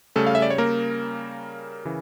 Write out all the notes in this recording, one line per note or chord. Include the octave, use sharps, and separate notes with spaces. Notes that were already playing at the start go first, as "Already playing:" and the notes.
C#3 G3 A3 C#4 A4
F5
E5
D5
C#5
A#3 A#4
C#3 E3